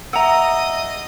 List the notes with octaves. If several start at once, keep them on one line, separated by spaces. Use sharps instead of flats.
D#5 E5 F#5 A#5 D#6 E6